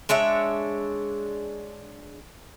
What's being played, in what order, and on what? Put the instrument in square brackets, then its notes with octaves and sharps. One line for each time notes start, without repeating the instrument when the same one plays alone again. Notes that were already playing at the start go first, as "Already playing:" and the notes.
[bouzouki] G#3 D4 C#5 E5